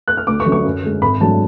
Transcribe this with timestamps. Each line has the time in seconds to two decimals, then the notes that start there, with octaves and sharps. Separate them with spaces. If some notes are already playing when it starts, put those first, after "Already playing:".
0.08 F#6
0.17 F6
0.27 D2 D6
0.40 C#6
0.46 D3 F#3 C#4
0.52 C#6
0.64 F#2
0.83 D3 G#3
1.02 G#1 B5
1.21 G#2 F#3 A3 D4 A5